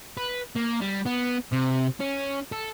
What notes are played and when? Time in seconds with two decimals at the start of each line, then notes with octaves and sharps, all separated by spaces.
0.17 B4
0.56 A#3
0.81 G3
1.06 B3
1.53 C3
2.00 C#4
2.52 A4